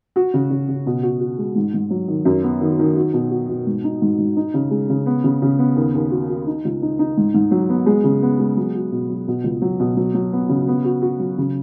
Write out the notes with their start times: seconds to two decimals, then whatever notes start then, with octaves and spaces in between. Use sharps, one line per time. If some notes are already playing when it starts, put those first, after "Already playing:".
0.16 F#4
0.34 C#3
0.50 C#3
0.68 C#3
0.86 B2
1.03 F#4
1.20 F#4
1.38 G#3
1.56 G#2
1.74 G#2
1.90 F#3
2.08 D#3
2.25 F#2
2.43 B3
2.61 D#3
2.79 D#3
2.96 F#4
3.14 B2
3.31 F#4
3.49 B2
3.67 G#2
3.84 D#4
4.02 G#2
4.18 G#2
4.37 D#4
4.54 C#3
4.71 G#3
4.89 C#3
5.06 B3
5.24 C#3
5.42 C#3
5.59 B3
5.76 D#2
5.95 D#2
6.11 F#4
6.29 F#4
6.46 D#4
6.65 C#2
6.82 D#4
6.99 D#4
7.17 G#2
7.34 G#2
7.51 F#3
7.69 B3
7.86 G#3
8.04 C#3
8.22 B3
8.39 G#3
8.57 F#3
8.74 F#4
8.92 B2
9.09 F#3
9.28 B2
9.44 C#2
9.62 F#3
9.80 B2
9.97 F#3
10.14 F#3
10.33 B3
10.49 C#3
10.68 B3
10.85 F#4
11.02 F#4
11.19 F#3
11.38 C#3